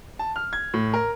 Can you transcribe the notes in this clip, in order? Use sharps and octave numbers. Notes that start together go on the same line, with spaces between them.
A5
F6
G#6
A2
A#4